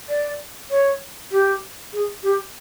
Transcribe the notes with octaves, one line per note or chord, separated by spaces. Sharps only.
D5
C#5
G4
G#4
G4